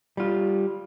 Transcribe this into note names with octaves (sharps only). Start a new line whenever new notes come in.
G3 F4